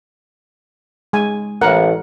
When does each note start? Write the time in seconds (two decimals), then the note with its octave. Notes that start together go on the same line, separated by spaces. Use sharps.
1.13 G#3 G#5
1.61 A1 A#4 F#5